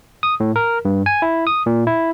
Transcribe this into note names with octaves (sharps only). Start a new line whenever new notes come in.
D#6
A2
A#4
G2
G#5
E4
D#6
A#2
E4